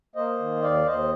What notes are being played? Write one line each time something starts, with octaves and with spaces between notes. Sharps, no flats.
A#3 C5 D#5
D#3
D#2 D5 F5
D#2 C5 D#5